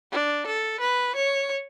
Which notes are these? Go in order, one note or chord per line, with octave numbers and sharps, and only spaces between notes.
D4
A4
B4
C#5